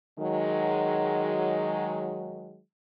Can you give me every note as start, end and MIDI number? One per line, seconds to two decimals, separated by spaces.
0.18 2.60 51
0.18 2.60 54
0.18 2.60 56